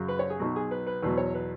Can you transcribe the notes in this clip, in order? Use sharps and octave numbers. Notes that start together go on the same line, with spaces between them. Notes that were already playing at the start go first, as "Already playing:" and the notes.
Already playing: F#2 C#3 F#3
B4
C#5
G#4
B1 B2 F#3 F#4
G#4
B4
B4
E2 B2 F#3 B4
C#5
B4